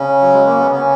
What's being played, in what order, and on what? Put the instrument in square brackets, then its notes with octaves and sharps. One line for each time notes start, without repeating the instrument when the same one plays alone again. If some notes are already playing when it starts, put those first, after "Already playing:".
Already playing: [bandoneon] C#3 C#4
F#3
G#3
A#3
B3
C#3 C#4